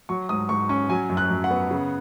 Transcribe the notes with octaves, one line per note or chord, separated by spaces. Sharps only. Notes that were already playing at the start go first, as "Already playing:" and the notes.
F#3 C#6
G#2 D#6
G#2 C#6
C#4 C#6
F#3 G#5
F#2
F#6
F#2
F#5
B3
C#3